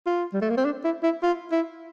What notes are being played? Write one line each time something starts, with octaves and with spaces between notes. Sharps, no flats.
F4
G3
A3
A#3
C4
D4
E4
E4
F4
E4